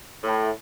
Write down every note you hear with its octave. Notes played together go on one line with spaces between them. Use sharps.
A2